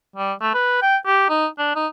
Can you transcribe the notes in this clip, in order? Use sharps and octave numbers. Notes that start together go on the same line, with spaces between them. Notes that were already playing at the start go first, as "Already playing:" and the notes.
G3
A3
B4
G5
G4
D#4
D4
D#4